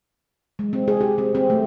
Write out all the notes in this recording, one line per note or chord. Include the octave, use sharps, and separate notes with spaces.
G#3
C4
G#4
G4
C4
C4
A3